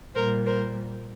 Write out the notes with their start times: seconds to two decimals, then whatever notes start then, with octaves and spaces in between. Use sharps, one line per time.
0.15 A#2 G3 A#4 C5
0.46 A#4 C5